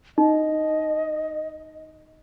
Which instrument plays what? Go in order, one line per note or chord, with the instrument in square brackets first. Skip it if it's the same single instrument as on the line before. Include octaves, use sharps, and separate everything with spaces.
[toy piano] D#4 [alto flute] D#5